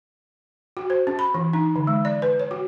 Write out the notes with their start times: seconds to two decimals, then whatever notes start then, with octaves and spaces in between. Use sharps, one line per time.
0.77 F#4
0.90 C5
1.07 C#4
1.19 B5
1.34 E3
1.53 D#4
1.76 D3
1.87 G#3
2.05 D5
2.22 B4
2.40 C#5
2.51 F#4